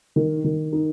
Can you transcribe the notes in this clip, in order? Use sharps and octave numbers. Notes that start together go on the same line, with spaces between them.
D#3
D#3
D#4